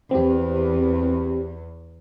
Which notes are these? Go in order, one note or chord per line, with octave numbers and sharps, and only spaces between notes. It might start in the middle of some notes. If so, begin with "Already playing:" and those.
E2 C4 G4